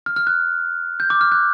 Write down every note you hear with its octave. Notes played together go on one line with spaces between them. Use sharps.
F6
F6
F#6
G6
D6
F6
F#6